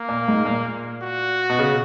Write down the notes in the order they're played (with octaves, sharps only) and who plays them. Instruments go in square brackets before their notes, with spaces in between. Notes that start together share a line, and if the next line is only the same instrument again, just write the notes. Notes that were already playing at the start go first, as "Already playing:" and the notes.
Already playing: [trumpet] A#3
[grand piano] A#2
G#2
A#2
[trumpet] F#4
[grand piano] B2
C#3